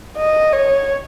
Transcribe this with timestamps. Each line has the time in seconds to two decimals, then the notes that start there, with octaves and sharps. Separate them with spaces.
0.17 D#5
0.53 C#5